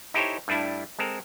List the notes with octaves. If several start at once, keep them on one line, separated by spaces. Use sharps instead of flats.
D#4 E4 G4 A4 C5 C#5
G2 G3 A3 D4 E4
G#3 C4 A4 A#4